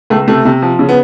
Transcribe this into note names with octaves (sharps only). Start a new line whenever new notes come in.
C#2 A3
C3 A3
C3
F3
C#3
B3